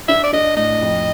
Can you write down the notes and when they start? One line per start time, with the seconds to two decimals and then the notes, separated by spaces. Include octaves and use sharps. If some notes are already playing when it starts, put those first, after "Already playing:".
0.08 D4 E5
0.24 D5
0.33 D4 D#5
0.56 A2 D#5
0.81 F2